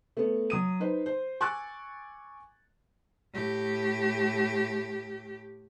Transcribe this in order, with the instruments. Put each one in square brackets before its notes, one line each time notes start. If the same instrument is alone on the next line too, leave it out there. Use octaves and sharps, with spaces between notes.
[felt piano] A3 B3
F#3 D#6 D#7
D#4 B4 C5
C5
G#5 C#6 D6 E6 F#6 A6
[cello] A2 G4